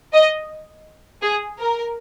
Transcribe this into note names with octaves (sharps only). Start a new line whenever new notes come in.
D#5
G#4
A#4